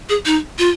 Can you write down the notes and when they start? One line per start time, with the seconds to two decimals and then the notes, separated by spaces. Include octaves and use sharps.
0.09 G#4
0.26 D#4
0.59 F4